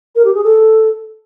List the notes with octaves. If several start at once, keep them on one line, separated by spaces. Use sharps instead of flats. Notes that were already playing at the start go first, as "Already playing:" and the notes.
A#4
G4
G#4
A4